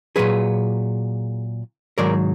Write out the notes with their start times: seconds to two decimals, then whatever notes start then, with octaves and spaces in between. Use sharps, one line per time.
0.16 A#2 F#3 G#4 B4
1.98 G#2 D#3 F#3 A#4 D5